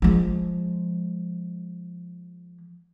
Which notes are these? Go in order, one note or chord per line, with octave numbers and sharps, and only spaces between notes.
F3 G#3